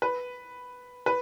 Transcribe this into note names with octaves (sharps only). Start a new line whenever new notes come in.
B4
B4